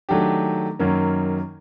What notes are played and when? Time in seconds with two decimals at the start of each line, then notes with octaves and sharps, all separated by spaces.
0.09 D#3 F#3 A3 D4 G4
0.79 F#2 D#3 F#3 A#3 C#4